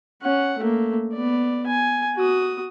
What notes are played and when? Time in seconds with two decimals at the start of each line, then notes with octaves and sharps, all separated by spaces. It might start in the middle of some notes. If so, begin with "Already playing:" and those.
0.22 C#4 F#5
0.59 A3 A#3
1.14 B3 D5
1.67 G#5
2.16 F#4 D#6